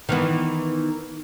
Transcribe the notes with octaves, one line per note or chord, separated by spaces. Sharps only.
D#3 E3 B3